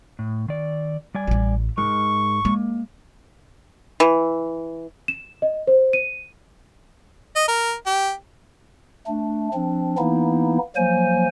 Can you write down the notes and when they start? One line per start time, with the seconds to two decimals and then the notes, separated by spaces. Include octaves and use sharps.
0.19 A2
0.48 D#3 D5
1.14 G3 D5 G#5
1.27 A1 E4
1.78 G#2 G#3 D#4 A#4 C#6
2.45 G#3 A#3
4.00 E3
5.08 E7
5.42 D#5
5.67 C5
5.93 D#7
7.36 D#5
7.48 A#4
7.86 G4
9.07 A3 D4
9.54 F3 C4 D4
9.98 E3 A#3 B3 D#4 E4
10.76 F3 F#3 A#3 C5 G#5